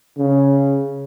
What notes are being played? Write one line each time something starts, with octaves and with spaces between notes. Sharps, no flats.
C#3